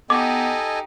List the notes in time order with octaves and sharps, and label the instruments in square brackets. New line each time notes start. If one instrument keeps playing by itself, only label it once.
[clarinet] B3 [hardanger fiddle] D#4 G4 [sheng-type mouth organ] A4 D#5 G#5 [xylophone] D6